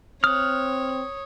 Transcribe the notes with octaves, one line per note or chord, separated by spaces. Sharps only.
C4 C#5 D#6 F6 F#6